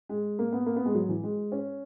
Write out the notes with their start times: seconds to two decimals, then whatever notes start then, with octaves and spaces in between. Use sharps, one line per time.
0.09 G#3
0.39 A#3
0.53 B3
0.66 A#3
0.76 B3
0.86 G#3
0.95 F#3
1.09 E3
1.23 G#3
1.52 C#4